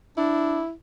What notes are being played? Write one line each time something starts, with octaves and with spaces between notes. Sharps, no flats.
D4 E4